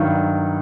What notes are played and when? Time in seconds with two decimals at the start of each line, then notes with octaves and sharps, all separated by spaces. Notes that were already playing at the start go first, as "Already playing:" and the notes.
Already playing: G2 D#3 F#3